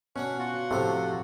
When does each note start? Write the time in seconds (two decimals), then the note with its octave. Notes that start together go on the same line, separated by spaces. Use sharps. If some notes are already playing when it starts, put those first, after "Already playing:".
0.16 B2 C#4 D4 C#5 F#5
0.39 F4 F#4 F#5
0.71 A2 C3 F3 A3 C5 C6